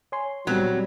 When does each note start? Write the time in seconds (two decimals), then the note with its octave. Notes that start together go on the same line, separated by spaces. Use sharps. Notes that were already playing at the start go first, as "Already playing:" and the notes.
0.12 C#5 G#5 C6
0.47 A#2 F#3 G3 B3 C4